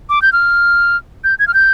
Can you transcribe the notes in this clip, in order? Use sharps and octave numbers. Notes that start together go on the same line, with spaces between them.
D6
G6
F6
G6
G#6
F6
G6